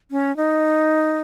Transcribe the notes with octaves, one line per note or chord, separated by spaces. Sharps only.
C#4
D#4